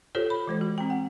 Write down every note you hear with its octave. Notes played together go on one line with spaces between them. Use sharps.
F4 G4 A4 C5 C#5
B5
E3 G#3 C5
F#4
C4 G5
F#5